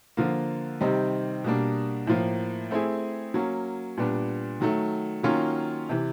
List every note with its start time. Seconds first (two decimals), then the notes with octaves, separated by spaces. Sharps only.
0.17 D3 F3 A#3
0.81 C3 D#3 G3 C4 D#4
1.44 B2 G3 A#3 D4
2.07 A2 F3 A#3
2.71 A3 C4 E4 G#4
3.34 F#3 A#3 C#4
3.97 A#2 G3 B3 D4
4.60 D#3 F#3 A3
5.23 D#3 F#3 A#3 C#4 F4
5.89 C3 E3